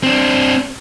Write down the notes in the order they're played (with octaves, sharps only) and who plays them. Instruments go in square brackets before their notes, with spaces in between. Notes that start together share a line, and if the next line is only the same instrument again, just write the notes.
[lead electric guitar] C4 D4